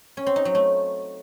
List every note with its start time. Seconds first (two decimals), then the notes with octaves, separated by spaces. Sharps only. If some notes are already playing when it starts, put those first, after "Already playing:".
0.17 C#4
0.27 C4
0.36 D#4
0.45 F#3
0.55 A3